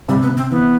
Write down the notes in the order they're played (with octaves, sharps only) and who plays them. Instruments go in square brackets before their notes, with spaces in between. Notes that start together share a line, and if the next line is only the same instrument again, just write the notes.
[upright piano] C3 [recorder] G3
[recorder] B3
[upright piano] C3
[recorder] C4
[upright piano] E3 [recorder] B3